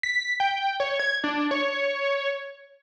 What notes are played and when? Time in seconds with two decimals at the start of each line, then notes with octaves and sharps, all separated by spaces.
0.03 B6
0.40 G5
0.80 C#5
1.00 G#6
1.24 D4
1.51 C#5